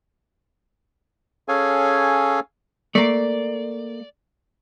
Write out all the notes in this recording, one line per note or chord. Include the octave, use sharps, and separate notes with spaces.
C#4 G#4 A4 C#5 F5 G#5
A3 A#3 D5